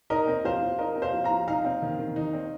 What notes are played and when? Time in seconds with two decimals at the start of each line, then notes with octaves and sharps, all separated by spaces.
0.10 D#4 A#4 D#5
0.27 C4
0.44 F3 C5 F5
0.62 F3
0.79 D#4 A#4 D#5
0.96 C4
1.02 C5 F5
1.13 F3
1.24 F5 A#5
1.30 F3
1.48 D#4 F5 A#5
1.65 C4
1.82 D#3
1.99 D#3
2.16 D#4
2.33 C4